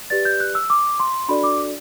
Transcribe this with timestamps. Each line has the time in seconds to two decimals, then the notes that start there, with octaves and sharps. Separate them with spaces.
0.10 G4 B4 D5 A6
0.25 G6
0.40 F#6
0.55 E6
0.70 D6
1.00 C6
1.29 D4 F#4 A4 D5 B5
1.44 D6